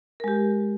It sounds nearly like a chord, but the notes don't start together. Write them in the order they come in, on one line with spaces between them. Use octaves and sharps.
A#4 G#3 G4